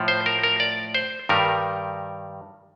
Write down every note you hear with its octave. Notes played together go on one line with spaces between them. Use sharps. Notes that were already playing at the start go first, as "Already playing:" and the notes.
Already playing: A2 F3
C5
A#4
A#4
D5
C5
G2 D#3 G3 A#4